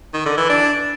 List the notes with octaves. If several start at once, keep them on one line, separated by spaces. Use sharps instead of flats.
D#3
D3
E3
D4